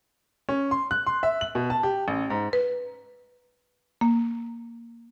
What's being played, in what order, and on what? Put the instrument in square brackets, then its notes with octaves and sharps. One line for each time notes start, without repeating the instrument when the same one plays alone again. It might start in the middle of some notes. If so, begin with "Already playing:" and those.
[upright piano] C#4
C6
F#6
C6
E5
F#7
B2
A5
G4
A1
G#2
[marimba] B4
A#3